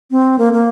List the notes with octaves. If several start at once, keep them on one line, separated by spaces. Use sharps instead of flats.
C4
A#3
A#3